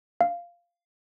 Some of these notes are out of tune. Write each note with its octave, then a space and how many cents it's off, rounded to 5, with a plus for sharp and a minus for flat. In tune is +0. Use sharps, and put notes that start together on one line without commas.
F5 -5